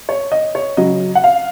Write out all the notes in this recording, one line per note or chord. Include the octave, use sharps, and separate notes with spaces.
C#5
D#5
C#5
C#3 F#3 D#5
F#5
F5